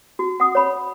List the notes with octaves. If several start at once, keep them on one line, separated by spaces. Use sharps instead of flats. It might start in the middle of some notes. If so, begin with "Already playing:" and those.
F#4
F#5 D#6
C#5 B5